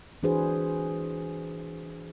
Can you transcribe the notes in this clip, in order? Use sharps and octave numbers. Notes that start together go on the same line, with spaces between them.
E3 D4 F#4 G#4 B4 C5